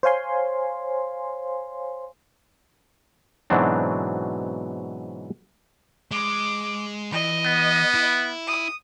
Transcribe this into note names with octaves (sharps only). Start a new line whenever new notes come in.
C5 C#5 F5 G#5 C6
G#2 B2 E3 F#3 C4 D4
G#3 D6
E3 D#5
B3
E4
D#6